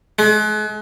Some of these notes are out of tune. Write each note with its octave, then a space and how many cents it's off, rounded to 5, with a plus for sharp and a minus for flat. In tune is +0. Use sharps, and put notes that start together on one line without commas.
G#3 +40